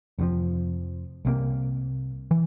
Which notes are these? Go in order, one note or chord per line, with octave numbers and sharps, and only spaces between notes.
F1 F2 C3 F3
C2 C3 F3 A#3
E3